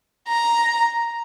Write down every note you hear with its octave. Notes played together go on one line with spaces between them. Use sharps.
A#5